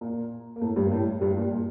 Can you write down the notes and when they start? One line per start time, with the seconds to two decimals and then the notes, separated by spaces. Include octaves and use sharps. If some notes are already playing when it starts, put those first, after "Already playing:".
0.01 A#2 A#3
0.56 A#3
0.61 A2 A3
0.76 G2 G3
0.85 A#3
0.91 A2 A3
1.21 G2 G3
1.37 A#2
1.51 A#2